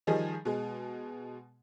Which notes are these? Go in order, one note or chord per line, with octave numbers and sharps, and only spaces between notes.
D#3 F3 G3 G#4 D#5
B2 G#3